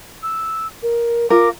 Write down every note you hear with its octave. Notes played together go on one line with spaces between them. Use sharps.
E6
A#4
F4 A#4 D6